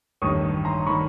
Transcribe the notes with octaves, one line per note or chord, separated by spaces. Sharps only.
A1 G2 D#3 C#6 D#6
A#5 C6
D#3 B5 C#6